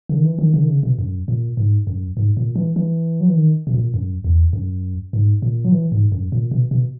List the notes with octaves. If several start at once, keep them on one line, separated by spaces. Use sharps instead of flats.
C#3
D#3
E3
D#3
C#3
D#3
C#3
B2
F#2
A#2
G#2
F#2
G#2
A#2
E3
E3
F#3
E3
D#3
B2
A#2
F#2
E2
F#2
G#2
A#2
F#3
E3
G#2
F#2
A#2
B2
B2